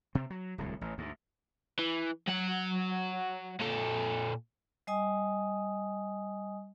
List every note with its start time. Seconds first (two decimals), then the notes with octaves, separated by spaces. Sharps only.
0.15 C3 C4
0.30 F#3
0.58 D1 C2 A2
0.81 A1
0.98 D2 G#2
1.79 E3
2.28 F#3 F#5
3.60 A#2 A4
4.87 G3 D#5 G#5 D#6